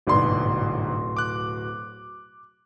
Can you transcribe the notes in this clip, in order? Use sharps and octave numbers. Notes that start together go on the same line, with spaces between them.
D1 G1 G#2 B2 D5 C6
D6 F#6